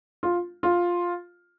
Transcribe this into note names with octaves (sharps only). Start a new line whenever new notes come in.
F4
F4